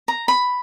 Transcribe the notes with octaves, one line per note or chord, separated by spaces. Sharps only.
A#5
B5